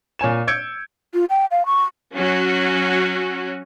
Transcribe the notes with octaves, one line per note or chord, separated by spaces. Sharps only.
A#2 C#5 G#5 E7
E6 G6 G#6 C#7 D7
F4
G5
F5
C#6
F#3 C#4 F#4